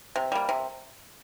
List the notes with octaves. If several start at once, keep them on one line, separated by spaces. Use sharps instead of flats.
C3
G3 A#3
C3